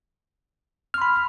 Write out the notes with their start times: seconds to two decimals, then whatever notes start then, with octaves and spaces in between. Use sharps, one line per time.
0.94 F6
0.98 C6
1.02 B5